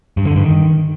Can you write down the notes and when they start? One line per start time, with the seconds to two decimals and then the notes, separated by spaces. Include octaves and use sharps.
0.17 G2
0.27 D3
0.36 G2
0.45 D#3